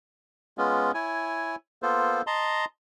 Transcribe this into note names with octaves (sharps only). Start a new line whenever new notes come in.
G#3 B3 C#4 F4
E4 C#5 G#5
A#3 B3 F4 A4 C5
D#5 A5 A#5 C6